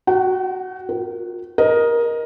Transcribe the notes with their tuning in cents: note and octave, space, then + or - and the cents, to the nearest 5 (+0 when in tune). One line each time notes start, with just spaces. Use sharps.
F#4 +0 G5 -45
F4 +30 A#4 +0
A#4 +15 D#5 +0